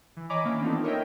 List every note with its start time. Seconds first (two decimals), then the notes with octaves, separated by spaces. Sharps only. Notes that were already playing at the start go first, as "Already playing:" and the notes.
0.17 E3
0.30 C#5 D#5 G#5 A#5 B5 D6
0.44 D#3 E3 A#3 C#4 D4
0.62 B3 C4 D4 D#4 F4 A4
0.84 A#4 C#5 D#5 E5 G5